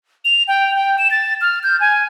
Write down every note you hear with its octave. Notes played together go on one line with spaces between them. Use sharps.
F7
G5
G5
E7
A6
F6
G6
G#5